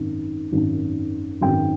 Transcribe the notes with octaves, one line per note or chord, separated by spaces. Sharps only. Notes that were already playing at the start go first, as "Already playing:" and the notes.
Already playing: G#1 F#2 D#3
G#1 F#2 D#3
G#1 F#2 D#3 G5